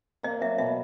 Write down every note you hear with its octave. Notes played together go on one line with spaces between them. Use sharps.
A#3 D#5
F#3 E5
B2 E5